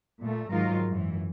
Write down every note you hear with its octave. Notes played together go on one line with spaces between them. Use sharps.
A#2 A3
G#2 D#3 F#3 D#4 F4 A#4
F#2 E3